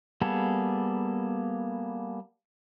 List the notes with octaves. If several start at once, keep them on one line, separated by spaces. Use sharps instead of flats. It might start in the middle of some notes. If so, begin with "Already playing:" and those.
G3 A#3 B3 G#4 A4